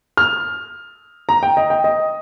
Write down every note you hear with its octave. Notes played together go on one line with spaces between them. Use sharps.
F6
A#5
G5
D#5
G5
D#5